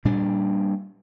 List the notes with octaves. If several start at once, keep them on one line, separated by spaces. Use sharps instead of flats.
A#2 G3 D4